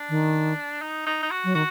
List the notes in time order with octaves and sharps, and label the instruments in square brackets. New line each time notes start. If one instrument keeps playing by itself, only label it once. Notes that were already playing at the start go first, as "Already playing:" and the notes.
Already playing: [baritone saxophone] D4
[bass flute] D#3
[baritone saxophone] D#4
D#4
D#4
F#4
[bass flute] F#3
[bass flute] D#3 [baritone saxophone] F#4